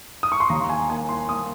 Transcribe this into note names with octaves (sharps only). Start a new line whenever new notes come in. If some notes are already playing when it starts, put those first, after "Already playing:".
D#6
C#6
C6
D#2 A#5
G#5
A#3 G#5
C6
A#3 D#6